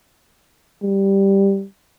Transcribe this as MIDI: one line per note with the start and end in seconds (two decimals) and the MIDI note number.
0.83 1.65 55